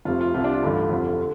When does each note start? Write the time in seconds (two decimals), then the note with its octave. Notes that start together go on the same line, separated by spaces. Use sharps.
0.05 F1 F2 C3 F4
0.21 F4
0.34 C2 C3 F4
0.44 D4
0.53 F4
0.62 A1 G2 D3
0.90 F1 F2 D3
1.19 D3